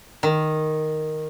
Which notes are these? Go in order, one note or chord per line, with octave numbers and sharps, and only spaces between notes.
D#3